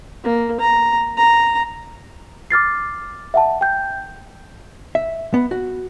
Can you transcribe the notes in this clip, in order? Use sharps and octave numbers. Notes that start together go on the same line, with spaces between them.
A#3
A#5
A#5
D6 F6 A6 C7
E5 F#5 A5
G5 G6
E5
B3
F#4